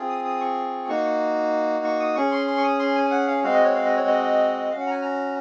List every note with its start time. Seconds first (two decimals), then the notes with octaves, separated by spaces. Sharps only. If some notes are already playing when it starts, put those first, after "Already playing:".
Already playing: C4 F4 G#4
0.09 D#6
0.25 D#6
0.41 C#6
0.88 A#3 D#4 F#4 C#6
1.84 C#6
2.00 D#6
2.15 C#4 G#4 C#6
2.32 C6
2.47 C6
2.57 C#6
2.64 D#6
2.79 C6
2.95 G#5
3.05 G#5
3.11 F#5
3.27 F5
3.43 G#3 C4 F#4 F5
3.54 D#5
3.64 C#5
3.75 F5
3.85 D#5
3.96 C#5
4.07 D#5
4.70 C#4 F#4 F5
4.80 F#5
4.87 A#5
4.91 G#5
5.02 A#5